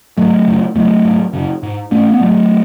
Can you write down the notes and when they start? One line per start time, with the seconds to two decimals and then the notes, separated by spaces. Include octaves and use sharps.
0.17 G#2 F#3 A3
0.46 F#2 C#3
0.75 E2 C#3 F#3 A3
1.05 G#2
1.33 F#2 C#3
1.63 G#2
1.91 G#2 A3 C#4
2.11 B3
2.20 G#2 F#3 A3